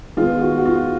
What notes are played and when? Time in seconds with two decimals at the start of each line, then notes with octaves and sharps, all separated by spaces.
0.17 D#3 G#3 B3 F4
0.41 F#4
0.58 F#4
0.65 F4